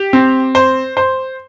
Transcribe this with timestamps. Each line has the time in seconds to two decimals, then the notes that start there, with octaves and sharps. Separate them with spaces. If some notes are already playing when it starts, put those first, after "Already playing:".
Already playing: G4
0.13 C4
0.55 C5
0.97 C5